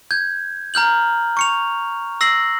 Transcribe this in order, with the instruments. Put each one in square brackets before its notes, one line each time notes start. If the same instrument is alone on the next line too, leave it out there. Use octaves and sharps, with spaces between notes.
[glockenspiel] G6 G#6
A#5 F6 G6 F#7
C#6 C#7 F7
E6 A#6 C7 F#7